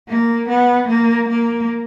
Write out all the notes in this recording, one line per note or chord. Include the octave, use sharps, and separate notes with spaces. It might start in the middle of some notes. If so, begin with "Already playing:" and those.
A#3
B3
A#3
A#3